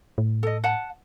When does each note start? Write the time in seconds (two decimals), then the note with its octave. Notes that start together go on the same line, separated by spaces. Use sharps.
0.18 A2
0.43 A4 D#5
0.64 F#5 A5